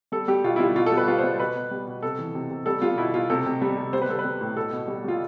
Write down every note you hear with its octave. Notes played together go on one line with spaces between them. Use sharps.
G3 A4
G3 G4
B2 F4
E4
G3 F4
B2 F4
A4
G3
B4
G3 F4
C5
G3
B2 B4
B2
G3
B2
C3 A4
E3
C3
C3
G3 A4
G3 F4
B2 E4
B2 F4
C3 A4
C3
G3
C3
G3 C5
B4
G3 A4
B4
G3
A2
B2 A4
B2
G3
G3 F4